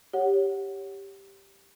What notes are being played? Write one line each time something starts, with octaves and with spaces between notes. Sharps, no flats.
G4 C#5 F#5